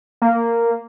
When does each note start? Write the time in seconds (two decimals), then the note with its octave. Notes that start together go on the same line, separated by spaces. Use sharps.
0.22 A#3